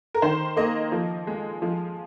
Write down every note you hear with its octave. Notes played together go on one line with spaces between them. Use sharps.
A#4
D#3 C5
A#3 D#5
F3
G#3
F3